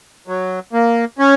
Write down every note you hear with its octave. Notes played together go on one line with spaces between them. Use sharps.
F#3
A#3
C#4